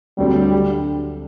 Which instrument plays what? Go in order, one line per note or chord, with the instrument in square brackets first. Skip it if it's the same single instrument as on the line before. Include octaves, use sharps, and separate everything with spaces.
[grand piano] D2 D3 F#3 C4 [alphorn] G3
[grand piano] D3